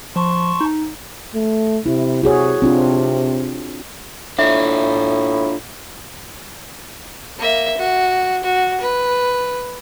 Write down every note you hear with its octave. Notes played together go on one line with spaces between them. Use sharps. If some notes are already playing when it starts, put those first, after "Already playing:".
F3 A5 C6 C#6
D#4
A3
C3 E4
C3 F#4 G#4 C#5
C3 C4 D4 F4
A2 D4 F4 E5
A#3 E5
F#4
F#4
B4